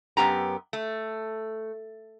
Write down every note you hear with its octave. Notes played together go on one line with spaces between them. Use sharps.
F#2 B3 G4 A#5
A3